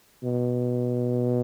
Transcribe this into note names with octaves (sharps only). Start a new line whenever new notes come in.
B2